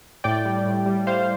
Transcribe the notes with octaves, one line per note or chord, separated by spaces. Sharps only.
A2 D5 G5
G3
A2
G3
A2 C5 F5